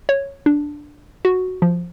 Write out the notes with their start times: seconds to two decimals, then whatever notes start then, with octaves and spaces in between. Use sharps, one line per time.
0.09 C#5
0.46 D4
1.25 F#4
1.62 F3